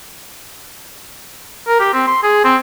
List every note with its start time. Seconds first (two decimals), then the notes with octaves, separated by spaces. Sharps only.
1.68 A#4
1.80 G4
1.93 C4
2.07 C6
2.23 G#4
2.44 C4